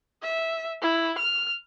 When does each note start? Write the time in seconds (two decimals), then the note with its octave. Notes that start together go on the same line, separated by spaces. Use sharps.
0.22 E5
0.81 E4
1.18 F6